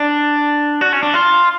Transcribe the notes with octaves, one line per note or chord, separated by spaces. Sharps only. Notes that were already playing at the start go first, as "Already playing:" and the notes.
Already playing: D4
F#4
C#4
D4
F4